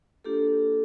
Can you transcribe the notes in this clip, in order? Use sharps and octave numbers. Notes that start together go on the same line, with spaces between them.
A#3 D4 F4 G4 A4